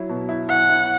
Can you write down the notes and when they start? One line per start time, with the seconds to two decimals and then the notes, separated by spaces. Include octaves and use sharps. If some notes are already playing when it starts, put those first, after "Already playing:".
Already playing: F#3 E4
0.09 B2
0.29 E4
0.49 E4 F#5
0.69 E4